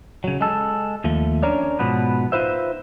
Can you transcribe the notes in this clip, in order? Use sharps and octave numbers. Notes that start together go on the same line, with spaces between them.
C#3 F#3
G#3 A4
D#2 F3 A3
C#4 D4 A#4 C#5 D5
G#2 B2 F3 B3 B4
D#4 F4 B4 C5 E5